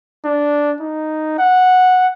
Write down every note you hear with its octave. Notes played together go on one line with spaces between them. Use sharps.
D4
D#4
F#5